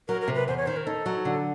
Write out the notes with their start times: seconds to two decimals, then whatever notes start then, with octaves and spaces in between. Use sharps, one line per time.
0.08 F#3 A#4
0.21 A#4
0.28 C3
0.35 B4
0.48 E2 C5
0.58 C#5
0.66 D#3 C5
0.77 A#4
0.86 D#4 A4
1.06 F#3
1.25 D3